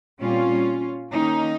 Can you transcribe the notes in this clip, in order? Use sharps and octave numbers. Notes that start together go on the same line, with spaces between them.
A#2 G3 C4 C#4 F4
D#3 A#3 C#4 D#4